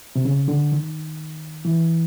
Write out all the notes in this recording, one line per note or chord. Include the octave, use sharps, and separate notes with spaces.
C3
C#3
D3
D#3
E3